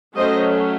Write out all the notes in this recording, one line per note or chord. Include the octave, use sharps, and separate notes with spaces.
F#3 A3 C#4 C5 D#5